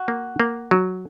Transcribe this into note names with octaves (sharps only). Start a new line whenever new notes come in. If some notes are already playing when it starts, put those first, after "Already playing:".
Already playing: F#4
A#3
A#3
F#3